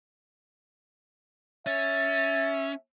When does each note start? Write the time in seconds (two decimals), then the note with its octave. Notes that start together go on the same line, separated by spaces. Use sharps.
1.66 C#4 E5 A6